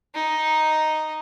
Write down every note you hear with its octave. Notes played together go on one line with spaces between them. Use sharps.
D#4